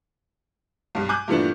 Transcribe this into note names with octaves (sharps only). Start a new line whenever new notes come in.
B1 G2
G#5 D6 F#6 G6
G2 A#2 E3 A3 B3 D4